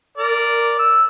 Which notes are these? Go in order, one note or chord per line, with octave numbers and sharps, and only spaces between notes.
A#4 D5
E6